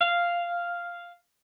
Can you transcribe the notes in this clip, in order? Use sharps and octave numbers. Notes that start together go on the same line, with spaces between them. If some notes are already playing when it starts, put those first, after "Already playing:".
F5